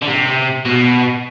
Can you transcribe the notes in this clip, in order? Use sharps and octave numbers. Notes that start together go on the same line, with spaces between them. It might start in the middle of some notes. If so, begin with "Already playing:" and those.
D3
C3
B2